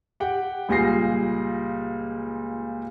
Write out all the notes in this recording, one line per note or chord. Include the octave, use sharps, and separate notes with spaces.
G4 F#5 G5
C#2 A#2 G3 G#4 A#6 C7